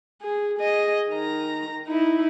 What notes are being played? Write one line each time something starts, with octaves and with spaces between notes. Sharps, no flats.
G#4
G#4 D#5
D#3 A#5
D#4 E4